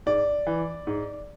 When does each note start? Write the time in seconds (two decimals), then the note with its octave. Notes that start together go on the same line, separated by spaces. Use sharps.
0.06 G#2 D5
0.47 E3
0.87 G#2